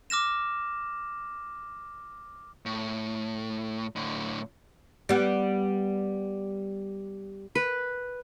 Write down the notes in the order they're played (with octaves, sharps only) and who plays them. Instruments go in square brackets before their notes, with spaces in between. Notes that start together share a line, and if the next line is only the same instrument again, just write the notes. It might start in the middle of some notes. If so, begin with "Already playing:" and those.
[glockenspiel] D6 F6 A#6 E7
[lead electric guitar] A2
A2 D3
[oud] G3 B3
[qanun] B4